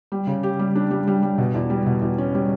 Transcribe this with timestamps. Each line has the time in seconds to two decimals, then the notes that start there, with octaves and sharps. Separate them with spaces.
0.12 G3
0.27 C#3
0.43 G4
0.59 G3
0.75 D4
0.91 G3
1.07 G3
1.23 G3
1.38 B2
1.54 E2
1.70 G3
1.86 B2
2.02 E2
2.18 C#4
2.35 G3